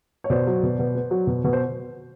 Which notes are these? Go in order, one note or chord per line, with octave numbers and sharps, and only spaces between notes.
C#5
B2 C5 D5
F#3
B2
B2
B3
F#3
B2
B2
C5